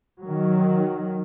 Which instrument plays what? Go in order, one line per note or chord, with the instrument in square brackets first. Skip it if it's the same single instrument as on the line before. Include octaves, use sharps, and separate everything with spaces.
[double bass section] D#3 F#3